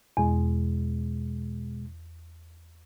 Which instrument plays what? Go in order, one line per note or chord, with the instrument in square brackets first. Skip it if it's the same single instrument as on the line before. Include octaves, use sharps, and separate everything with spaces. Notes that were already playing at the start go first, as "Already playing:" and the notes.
[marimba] E2 [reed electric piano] B2 G#3